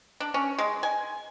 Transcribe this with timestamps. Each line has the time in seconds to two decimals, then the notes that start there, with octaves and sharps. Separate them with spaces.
0.20 D4
0.34 C#4
0.58 G#3
0.83 G#5